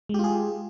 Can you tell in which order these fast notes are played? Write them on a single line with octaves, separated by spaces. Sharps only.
G#3 G4 F4 G#4